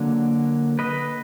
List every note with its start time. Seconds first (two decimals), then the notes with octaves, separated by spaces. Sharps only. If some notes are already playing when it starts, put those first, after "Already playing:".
Already playing: D3 F#3 A#3
0.79 B4 D#5